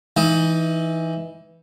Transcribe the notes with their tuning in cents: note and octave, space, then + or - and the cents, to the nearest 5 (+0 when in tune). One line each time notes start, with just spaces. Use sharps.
E3 +0 D#4 +15